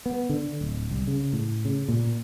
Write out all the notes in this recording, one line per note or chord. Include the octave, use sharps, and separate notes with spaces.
B3
D3
D1
C2
C#3
A2
C#3
A#2